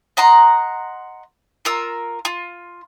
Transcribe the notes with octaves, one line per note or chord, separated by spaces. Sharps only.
D#5 F#5 A#5 C6
F4 A#4 E6
F4